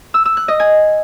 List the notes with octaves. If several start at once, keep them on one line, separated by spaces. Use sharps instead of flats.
E6
E6
F#6
D#5
G#5